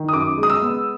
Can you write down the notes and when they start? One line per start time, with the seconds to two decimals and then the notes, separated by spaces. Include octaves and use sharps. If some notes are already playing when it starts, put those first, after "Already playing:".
Already playing: D#3
0.09 D#6
0.13 F#2 D6
0.38 G#3
0.43 D#6
0.50 E6
0.61 B3